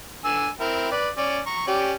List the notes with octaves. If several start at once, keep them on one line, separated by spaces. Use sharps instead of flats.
D3 G#5 E6
C4 E4 A#4
B4 D5
C#4 D5
A#5 C#6
C#4 G4 D5